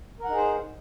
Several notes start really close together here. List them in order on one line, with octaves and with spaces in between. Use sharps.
A#4 F#5 D#4 G#4 C5